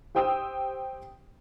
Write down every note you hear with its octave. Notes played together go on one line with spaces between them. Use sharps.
G4 C5 G5 D#6 E6